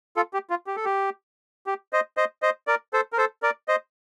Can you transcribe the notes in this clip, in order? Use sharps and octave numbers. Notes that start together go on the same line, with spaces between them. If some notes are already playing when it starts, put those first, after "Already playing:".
F4 A4
G4
F4
G4
A4
G4
G4
C5 D#5
C5 D#5
C5 D#5
A#4 D5
A4 C5
A#4
A4 C5
A#4 D5
C5 D#5